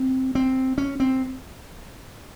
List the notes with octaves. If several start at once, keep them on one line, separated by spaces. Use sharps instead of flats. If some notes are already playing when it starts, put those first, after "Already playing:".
Already playing: C4
C4
C#4
C4